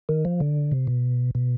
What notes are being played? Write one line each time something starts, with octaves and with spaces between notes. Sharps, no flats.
D#3
F3
D3
C3
B2
B2